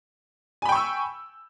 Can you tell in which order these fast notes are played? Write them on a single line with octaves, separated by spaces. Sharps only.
G#5 B5 G5 C#6 E6